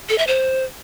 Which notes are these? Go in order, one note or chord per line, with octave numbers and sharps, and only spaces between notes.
A4
E5
C5